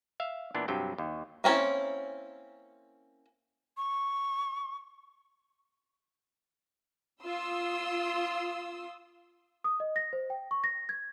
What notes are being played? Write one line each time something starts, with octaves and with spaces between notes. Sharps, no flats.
E5 F5
A#2 E3 B3 D4
G2 C3 F#3 G5
D#2
A#3 C4 C#4 E4
C#6
F4 C6 D#6 E6
D#6
D#5
A#6
C5
G5
C#6
A#6
G#6